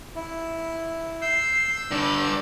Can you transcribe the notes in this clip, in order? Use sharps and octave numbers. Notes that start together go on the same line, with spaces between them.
E4
E6 G6 C7
G2 D3 D6